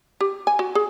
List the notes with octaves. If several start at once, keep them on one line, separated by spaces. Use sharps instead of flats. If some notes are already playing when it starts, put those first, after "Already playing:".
G4
G#5
F#4
G#4